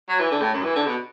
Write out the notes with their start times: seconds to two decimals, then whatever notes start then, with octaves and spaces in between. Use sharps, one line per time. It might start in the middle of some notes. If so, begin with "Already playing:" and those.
0.09 F#3
0.20 E3
0.31 D3
0.42 A2
0.53 F#2
0.63 E3
0.76 D3
0.86 B2